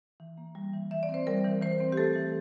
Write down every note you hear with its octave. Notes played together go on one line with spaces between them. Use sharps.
E3
A#3
G3
E3
E3 E5
D5
C4
C5
G3 A#4
E3
E3 C5
C4
G4
A3 A4
E3